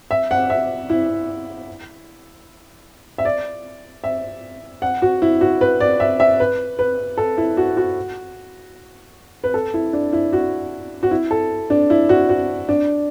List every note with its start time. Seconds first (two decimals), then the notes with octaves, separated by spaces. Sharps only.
0.11 E5
0.31 F#5
0.50 E5
0.90 E4
3.18 E5
3.25 D5
4.04 E5
4.82 F#5
5.02 F#4
5.22 E4
5.41 F#4
5.61 B4
5.80 D5
6.00 E5
6.20 E5
6.40 B4
6.79 B4
7.17 A4
7.38 E4
7.57 F#4
7.77 F#4
9.44 B4
9.54 A4
9.74 E4
9.93 D4
10.13 E4
10.33 F#4
11.03 F#4
11.11 E4
11.31 A4
11.70 D4
11.90 E4
12.09 F#4
12.29 F#4
12.69 D4